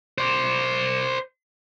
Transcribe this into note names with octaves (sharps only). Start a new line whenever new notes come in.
C5 D5